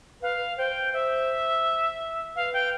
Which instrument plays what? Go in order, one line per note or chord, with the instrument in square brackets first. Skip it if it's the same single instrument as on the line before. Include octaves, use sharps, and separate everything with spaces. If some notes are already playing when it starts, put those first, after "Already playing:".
[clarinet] B4 [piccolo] F5
[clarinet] C5 [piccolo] G5
[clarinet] C5 [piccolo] E5
[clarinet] B4 [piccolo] F5
[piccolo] G5